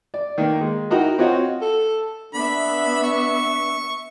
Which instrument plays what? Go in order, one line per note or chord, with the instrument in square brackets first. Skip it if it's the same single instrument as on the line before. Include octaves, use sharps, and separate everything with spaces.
[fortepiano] D5
D#3 A#3
G#3
D#4 E4 F#4 A#4 F#5 G5
C4 F4 F#4 C#5 D#5 F#5
[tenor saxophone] A4
[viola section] B3 E5 [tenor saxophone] D4 [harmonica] B5
[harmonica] C#6